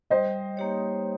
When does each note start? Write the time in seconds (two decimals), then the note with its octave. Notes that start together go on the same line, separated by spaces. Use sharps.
0.10 G3 C5 D#5
0.57 A#3 D#4 G4 C#5